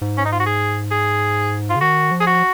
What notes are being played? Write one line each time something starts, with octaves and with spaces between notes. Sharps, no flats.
G#2
C#4
D#4
F4
F#4
G#4
G#4
F4
C#3
D#3 F#4
F3
G#4
F#4